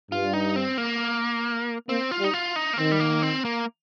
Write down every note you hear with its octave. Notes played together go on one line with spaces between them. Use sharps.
G2 F4
D#4
C4
A#3
A#3 C4
F4
G3
D#4
F4
D#4
A#3
D#3 C4
G3
A#3
C4
A#3